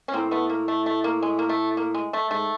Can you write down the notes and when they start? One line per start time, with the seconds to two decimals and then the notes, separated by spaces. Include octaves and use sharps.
0.08 C#4
0.13 A2 A#3 C4
0.31 A3 B3
0.49 A#3
0.68 A3
0.86 A3
1.04 A#3
1.22 G#3
1.39 A#3
1.49 A3
1.77 A#3
1.94 G#3
2.13 A3
2.31 G#2 A3